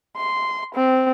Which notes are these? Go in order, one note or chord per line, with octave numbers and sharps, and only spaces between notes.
C6
C4